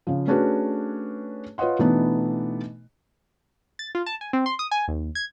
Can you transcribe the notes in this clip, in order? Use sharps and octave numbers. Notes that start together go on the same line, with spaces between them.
C#3 F3
A3 C#4 D4 F#4 G#4 B4
F4 B4 C#5 D#5 F#5 C6
B2 E3 A3 B3 D4 D#4
A6
F4
A5
G#5
C4
C6
D#6
G#5
D#2
G#6